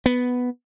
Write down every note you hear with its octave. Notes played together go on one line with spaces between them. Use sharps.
B3